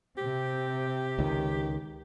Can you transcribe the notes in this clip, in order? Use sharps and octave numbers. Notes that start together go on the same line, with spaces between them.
C3 C4 G4
C#2 D#3